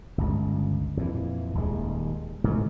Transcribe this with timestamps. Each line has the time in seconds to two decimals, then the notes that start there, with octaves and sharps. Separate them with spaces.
0.18 G1 C#2
0.97 F2 A#2 E3
1.55 D#1 D#2 G#3
2.44 G#2 E3 A3